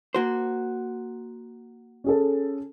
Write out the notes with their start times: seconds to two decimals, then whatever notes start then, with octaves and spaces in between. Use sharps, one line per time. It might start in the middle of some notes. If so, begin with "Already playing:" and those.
0.15 A#3 F#4 C5
2.04 C#4 G#4 A4